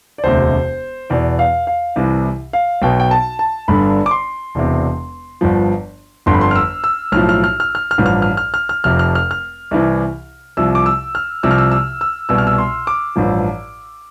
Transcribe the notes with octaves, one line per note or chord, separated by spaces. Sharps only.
D5
E1 D2 C3 C5
E2 B2 D5
F5
F5
C2 C3 E3
F5
B1 B2 G5
G5
A5
A5
G1 G2 D3 B5
D6
C6
E1 E2 C3
G1 G2 F3
G1 F2 D3 C6
B5
C6
F6
E6
E6
B1 A2 F3 F6
F6
F6
F6
F6
F6
A1 G2 F3
F6
F6
F6
F6
F6
F1 F2 C3 F3 F6
F6
F6
F6
C2 C3 E3
C2 C3 F3 E6
D6
E6
F6
C2 C3 F3 E6
F6
E6
E6
E6
C2 B2 E6
F6
E6
C6
D6
A1 G2 F3